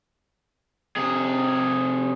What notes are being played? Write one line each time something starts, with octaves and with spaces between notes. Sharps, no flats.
C3 G#4